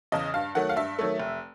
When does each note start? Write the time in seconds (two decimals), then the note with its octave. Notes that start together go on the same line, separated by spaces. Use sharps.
0.12 E2 C#3 D#5
0.34 G2 F5
0.55 D#3 F#3 A3 F#5
0.69 F5
0.76 G2 E5
0.99 D#3 F#3 A3
1.19 F1